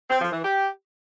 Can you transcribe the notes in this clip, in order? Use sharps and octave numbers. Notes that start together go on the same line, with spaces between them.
C4
F3
E3
G4